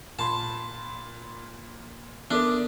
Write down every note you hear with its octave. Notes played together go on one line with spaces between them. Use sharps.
A#2 A5 B5 C6
B3 D4 E4 A4 A#4 D5